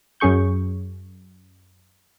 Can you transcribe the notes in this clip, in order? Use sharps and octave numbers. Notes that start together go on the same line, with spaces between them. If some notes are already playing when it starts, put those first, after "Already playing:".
F#2 C#4 G#4 C#6 G6